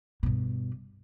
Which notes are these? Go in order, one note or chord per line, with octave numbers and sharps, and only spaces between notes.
G2 B2